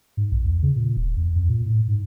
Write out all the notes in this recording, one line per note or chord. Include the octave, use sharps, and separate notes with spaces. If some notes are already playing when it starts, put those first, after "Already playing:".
G#2
B1
E2
C#3
A#2
D#1
E2
F2
A#2
A2
G#2